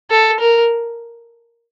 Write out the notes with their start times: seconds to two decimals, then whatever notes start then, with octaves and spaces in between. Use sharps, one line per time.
0.10 A4
0.40 A#4